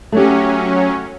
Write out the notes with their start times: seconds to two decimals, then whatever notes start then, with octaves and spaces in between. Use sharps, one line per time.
0.12 F#3 A3 C#4 G4